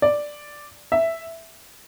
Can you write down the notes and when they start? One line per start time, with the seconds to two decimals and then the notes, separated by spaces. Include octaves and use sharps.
0.02 D5
0.92 E5